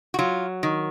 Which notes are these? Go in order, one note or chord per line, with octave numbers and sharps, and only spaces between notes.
F#4
F#3 F4
D#3